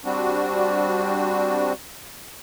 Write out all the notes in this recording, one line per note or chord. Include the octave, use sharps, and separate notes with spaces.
G3 C4 D4 F#4